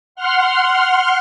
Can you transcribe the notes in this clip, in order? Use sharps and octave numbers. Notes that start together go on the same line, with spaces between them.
F#5 C6 F6